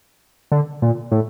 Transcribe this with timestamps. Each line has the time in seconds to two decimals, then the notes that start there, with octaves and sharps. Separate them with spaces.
0.52 D3
0.82 A#2
1.11 A2